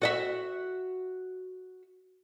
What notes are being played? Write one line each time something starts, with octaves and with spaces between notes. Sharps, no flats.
F#4 D#5 E5